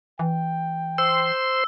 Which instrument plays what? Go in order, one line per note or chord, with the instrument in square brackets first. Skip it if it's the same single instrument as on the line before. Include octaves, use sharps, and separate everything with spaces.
[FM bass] E3 [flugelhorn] G5
[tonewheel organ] C5 C6 [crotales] E6